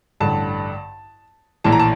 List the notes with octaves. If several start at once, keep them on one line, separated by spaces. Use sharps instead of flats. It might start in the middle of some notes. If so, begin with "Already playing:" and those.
A1 G2 D3 A5
A#1 A2 E3 A5
A#5
A5